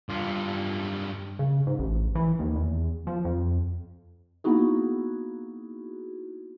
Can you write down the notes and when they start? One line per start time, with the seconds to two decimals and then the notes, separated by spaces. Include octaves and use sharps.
0.09 G2 F4
1.39 C#3
1.67 G#2
1.79 A1
2.15 E3
2.39 D#2
2.56 E2
3.07 F3
3.25 F2
4.44 A#3 B3 D#4 E4 F#4 G#4